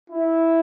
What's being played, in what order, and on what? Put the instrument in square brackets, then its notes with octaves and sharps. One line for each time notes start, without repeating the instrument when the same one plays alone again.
[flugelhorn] E4